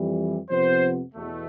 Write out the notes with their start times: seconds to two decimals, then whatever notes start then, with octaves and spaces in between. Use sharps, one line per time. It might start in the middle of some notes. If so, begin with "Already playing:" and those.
Already playing: F2 E3 G3
0.51 F2 C3 F3 B3 C5
1.14 E2 B2 A3